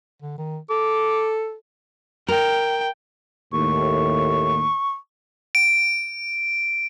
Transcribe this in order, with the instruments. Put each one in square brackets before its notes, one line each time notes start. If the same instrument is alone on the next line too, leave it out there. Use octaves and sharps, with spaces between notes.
[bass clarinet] D3
D#3
[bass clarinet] A4 [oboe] D6
[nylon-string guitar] A#4 [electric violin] G5
[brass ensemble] D#2 A2 [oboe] C#6
[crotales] D7